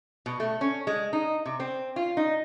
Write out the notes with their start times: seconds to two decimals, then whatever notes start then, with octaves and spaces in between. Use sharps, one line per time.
0.26 B2
0.40 A3
0.61 C#4
0.87 G#3
1.13 D#4
1.46 C3
1.60 C4
1.96 F4
2.17 D#4